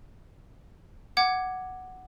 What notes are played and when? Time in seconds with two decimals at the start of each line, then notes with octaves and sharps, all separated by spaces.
1.17 F#5 D6 G#6